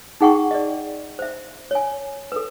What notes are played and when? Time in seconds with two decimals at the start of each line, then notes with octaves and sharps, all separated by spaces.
0.21 D#4 G#4 F#5 G5 C#6
0.51 D5 D#5
1.19 C5 E5
1.71 C#5 G#5
2.32 A4 B4